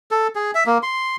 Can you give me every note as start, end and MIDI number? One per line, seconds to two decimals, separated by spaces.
0.11 0.28 69
0.35 0.51 68
0.55 0.64 76
0.66 0.78 58
0.83 1.16 84